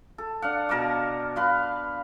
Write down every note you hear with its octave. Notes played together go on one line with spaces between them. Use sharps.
A4
D4 F5 F#5
B2 A#4 A5 D6
B4 F5 C6